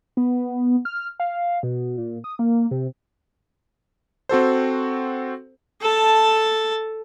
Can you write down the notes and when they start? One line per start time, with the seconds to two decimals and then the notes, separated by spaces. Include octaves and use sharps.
0.17 B3
0.85 F6
1.20 F5
1.63 B2
1.98 A#2
2.24 D#6
2.39 A#3
2.71 C3
4.29 C4 F#4 A4 C5
5.81 A4 A5